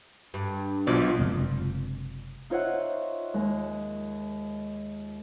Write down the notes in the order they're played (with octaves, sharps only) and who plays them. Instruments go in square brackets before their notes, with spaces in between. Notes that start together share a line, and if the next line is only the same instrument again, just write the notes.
[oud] G2
[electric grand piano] B1 B2 F3 [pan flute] F4 [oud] D5
[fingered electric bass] F#1 C3 G#3 C4
[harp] D#4 F4 C5 C#5 E5 F#5
D#2 G#3